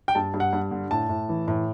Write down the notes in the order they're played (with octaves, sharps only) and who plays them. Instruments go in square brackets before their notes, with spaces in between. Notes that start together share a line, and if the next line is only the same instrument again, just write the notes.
[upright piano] G5
G2 A5
G2
F#5
G2
D3
A2 A5
A2
E3
A2